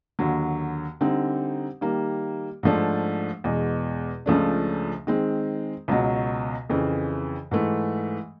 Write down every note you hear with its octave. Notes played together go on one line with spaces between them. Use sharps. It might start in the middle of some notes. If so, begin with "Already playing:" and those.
D#2 D3 F#3
D3 G3 C4 D#4
D#3 G3 A#3
G#2 F3 A3 D4
E2 B2 G#3
C#2 C#3 F3 A3 D4
D#3 G#3 C4
C#2 B2 F#3
F2 C#3 E3
G#2 E3 A3